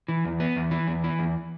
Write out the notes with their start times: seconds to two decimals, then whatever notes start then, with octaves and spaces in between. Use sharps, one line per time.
0.08 E3
0.25 E2
0.40 B3
0.56 E2
0.71 E3
0.87 E2
1.04 E3
1.19 E2